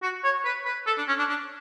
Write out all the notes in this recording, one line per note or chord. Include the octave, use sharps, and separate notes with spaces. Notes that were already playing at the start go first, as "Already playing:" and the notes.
F#4
C#5
B4
B4
A4
D4
C#4
D4
D4